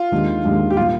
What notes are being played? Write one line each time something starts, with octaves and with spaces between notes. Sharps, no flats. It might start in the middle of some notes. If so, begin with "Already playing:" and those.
Already playing: F4
D#2 D#3 G#3 D4
D#2 D#3 G#3 D4
G4
A#2 G3 F4